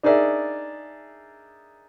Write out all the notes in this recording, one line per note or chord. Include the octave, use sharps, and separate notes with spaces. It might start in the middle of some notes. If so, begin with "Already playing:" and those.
D4 D#4 G#4 A#4 D5 E5